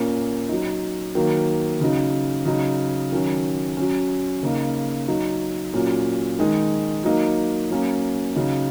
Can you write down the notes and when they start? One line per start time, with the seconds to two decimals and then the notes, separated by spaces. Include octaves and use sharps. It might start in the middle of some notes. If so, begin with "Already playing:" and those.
Already playing: A#2 A#3 C#4
0.49 F#3 D#4
1.15 D#3 F#3 A#3
1.80 C#3 F#3 D#4
2.45 C#3 F#3 D#4
3.12 D#3 F#3 C#4
3.77 F#3 C#4
4.43 C#3 A#3 D#4
5.08 F#3 D#4
5.73 A#2 F#3 C#4
6.39 D#3 G#3 D#4
7.04 F#3 A#3 D#4
7.70 F#3 A#3 C#4
8.36 C#3 F#3 D#4